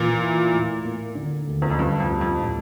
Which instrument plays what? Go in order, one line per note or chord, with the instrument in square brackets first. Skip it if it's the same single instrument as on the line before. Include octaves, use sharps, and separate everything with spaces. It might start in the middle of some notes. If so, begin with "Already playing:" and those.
Already playing: [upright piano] A#2 [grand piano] E3
[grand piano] E4
A2
A#3
D3
D2
[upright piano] E2
F2
[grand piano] D2 [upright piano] G2
[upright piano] F2
[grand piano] G3
[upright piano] F2
[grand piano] A2